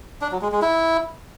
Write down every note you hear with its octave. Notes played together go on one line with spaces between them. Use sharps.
D4
F#3
G#3
G#3
E4